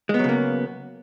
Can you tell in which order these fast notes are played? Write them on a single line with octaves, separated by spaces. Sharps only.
G#3 B3 F#3 C#3 A#3